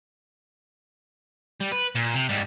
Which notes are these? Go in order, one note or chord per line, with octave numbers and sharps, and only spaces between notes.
G3
B4
A#2
C3
G#2 G3